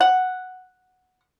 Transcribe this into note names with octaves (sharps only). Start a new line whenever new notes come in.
F#5